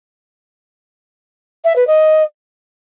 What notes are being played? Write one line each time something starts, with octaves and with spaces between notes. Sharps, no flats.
E5
B4
D#5